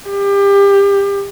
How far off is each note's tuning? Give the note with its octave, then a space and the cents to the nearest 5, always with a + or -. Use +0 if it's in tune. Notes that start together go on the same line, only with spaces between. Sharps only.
G4 +30